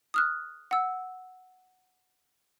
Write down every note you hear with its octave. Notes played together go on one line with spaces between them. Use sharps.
D#6 F6 F#6
F#5 E6